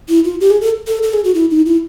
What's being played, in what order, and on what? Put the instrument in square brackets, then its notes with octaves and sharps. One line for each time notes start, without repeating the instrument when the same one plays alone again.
[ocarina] E4
F4
G4
G#4
A4
A4
A4
G#4
F#4
E4
D#4
E4